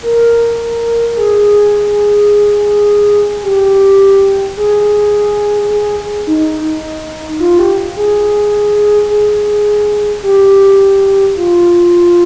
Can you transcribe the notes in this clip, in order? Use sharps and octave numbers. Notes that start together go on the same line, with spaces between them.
A#4
G#4
G4
G#4
G#4
D#4
F4
G4
G#4
G#4
G4
F4